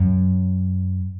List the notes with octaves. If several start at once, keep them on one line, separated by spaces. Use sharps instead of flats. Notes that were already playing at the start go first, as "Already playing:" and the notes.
Already playing: F#2